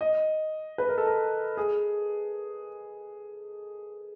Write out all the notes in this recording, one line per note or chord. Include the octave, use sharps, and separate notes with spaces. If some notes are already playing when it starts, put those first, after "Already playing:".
D#5
B4
A#4
A4
A#4
G#4